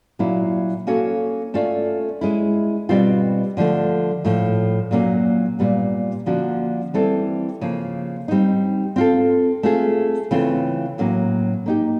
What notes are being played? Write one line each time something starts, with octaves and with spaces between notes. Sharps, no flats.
A#2 F#3 A#3 C#4 E4
A#3 C#4 F#4 A4 C#5
A3 C#4 F4 A4 D5
G#3 C#4 E4
B2 G3 C4 F4
D3 F3 A3
A2 F3 A3
A#2 F#3 A#3 C#4
A#2 G3 B3
D3 F3 A#3 C#4 F#4
E3 G3 C4 E4 A4
C#3 F3 A#3
G3 C4 D#4
C4 F4 A4
A3 C4 F4 G#4
C#3 E3 A3 C4 F4
A2 F#3 A#3 C#4
A#3 D#4 G4